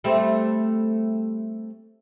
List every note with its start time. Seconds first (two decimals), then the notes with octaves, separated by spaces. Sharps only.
0.04 G3 A3 C4